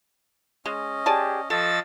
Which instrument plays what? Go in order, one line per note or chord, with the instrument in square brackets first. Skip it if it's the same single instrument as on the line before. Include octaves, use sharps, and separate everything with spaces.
[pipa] G#3 [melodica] C#4 D#5
[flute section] G4 G#4 [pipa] D5 G#5 A5
[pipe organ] F3 E6 A6 [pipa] A4 [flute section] D#5 [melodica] C#6 D#6